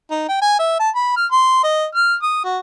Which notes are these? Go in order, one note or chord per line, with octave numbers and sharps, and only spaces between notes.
D#4
G5
G#5
E5
A5
B5
F6
C6
D#5
F6
D#6
F#4